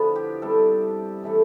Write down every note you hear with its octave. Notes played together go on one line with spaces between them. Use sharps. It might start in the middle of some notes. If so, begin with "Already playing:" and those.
Already playing: D3 F3 B3 D4 E4
G4
C3 G3 B3 D4 A4
A2 E3 A3 D4